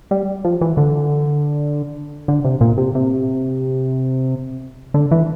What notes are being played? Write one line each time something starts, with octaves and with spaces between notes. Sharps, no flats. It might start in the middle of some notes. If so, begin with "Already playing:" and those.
G3
F3
E3
D3
D3
C3
A#2
C3
C3
D3
E3